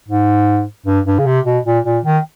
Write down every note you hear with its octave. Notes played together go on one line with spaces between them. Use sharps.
G#2
G2
G2
C#3
C3
B2
A#2
A#2
D#3